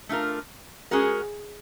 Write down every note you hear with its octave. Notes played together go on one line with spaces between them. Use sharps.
A3 D4 F4 A#4
G#3 C#4 F#4 G#4 A#4